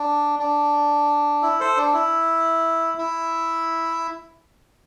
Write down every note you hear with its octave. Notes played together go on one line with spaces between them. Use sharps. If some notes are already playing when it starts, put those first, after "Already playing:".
Already playing: D4
D4
E4
A4 C5
D4
E4
E4